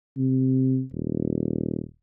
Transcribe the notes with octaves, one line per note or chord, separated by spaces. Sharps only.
C3
D#1